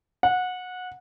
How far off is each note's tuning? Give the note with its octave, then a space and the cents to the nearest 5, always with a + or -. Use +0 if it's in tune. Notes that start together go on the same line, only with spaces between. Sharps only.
F#5 -20